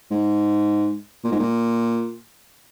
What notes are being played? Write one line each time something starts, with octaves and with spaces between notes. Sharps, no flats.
G#2
A#2
G#2
A#2